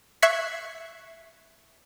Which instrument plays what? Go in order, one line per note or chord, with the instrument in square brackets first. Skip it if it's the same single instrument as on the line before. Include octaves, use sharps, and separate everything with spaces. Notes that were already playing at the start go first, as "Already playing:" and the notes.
[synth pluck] E5 C#6 F#6 G#6 B6 C7